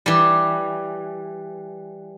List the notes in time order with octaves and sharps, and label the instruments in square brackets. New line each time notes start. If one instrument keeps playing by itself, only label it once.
[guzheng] E3 G3